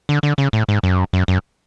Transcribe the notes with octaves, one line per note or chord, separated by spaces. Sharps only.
D3
D3
C#3
A2
G#2
F#2
F#2
F#2